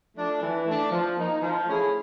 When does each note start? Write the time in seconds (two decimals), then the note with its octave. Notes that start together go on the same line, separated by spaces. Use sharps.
0.17 F3 A3 D4
0.41 E3
0.66 A3 D4
0.91 F3
1.17 A#3 D#4
1.42 F3
1.66 A3 C#4 E4 G#4